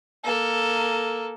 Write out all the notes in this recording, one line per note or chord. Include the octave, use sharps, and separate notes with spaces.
A#3 A4